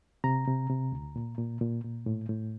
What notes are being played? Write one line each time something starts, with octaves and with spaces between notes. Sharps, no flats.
C3 A#5
C3
C3
D2
A#2
A#2
A#2
A#2
A2
A2